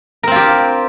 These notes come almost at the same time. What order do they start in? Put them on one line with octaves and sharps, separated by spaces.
A#4 C4 F4 G4